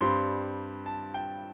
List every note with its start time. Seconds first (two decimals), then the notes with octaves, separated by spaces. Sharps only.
0.01 G2 G3 C4 C6
0.86 A5
1.14 G5